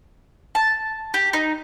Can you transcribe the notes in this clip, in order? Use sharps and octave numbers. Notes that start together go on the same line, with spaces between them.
A5
G4
D#4